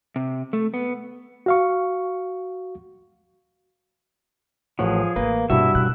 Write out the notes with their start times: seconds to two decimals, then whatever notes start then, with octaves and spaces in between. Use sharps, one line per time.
0.16 C3
0.53 A3
0.74 B3
1.46 F#4 F5 C#6
4.79 A1 F3 G#4 C#5 F#5
5.16 A1 A#3 B4
5.50 G2 B2 F#3 E4 F#4 E5
5.75 B2 F#6